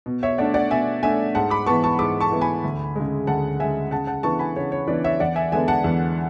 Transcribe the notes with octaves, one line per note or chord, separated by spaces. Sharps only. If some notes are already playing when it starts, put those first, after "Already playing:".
B2
C#5 E5
A3 D4 D5 F#5
D5 F#5
B2 E5 G#5
A3 D4 E5 G#5
G#2 F#5 A5
B5 D6
E3 B3 A5 C#6
A5 C#6
G#2 B5 D6
A5 C#6
E3 B3
G#5 B5
D2
C#3 G#3
D2 F#5 A5
C#3 G#3 E5 G#5
C#3 F#5 A5
F#5 A5
E3 B3 D4 A5 C#6
G#5 B5
C#3 C#5
C#5
E3 B3 D4 B4 D5
C#5 E5
E2 D5 F#5
E5 G#5
D3 G#3 B3 D4 E5 G#5
F#5 A5
E2